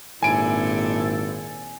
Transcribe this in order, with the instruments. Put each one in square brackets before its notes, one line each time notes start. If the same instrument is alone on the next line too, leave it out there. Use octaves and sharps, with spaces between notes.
[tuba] G#1 [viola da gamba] A#2 C4 D4 [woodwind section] E4 A4 [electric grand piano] G#5 D7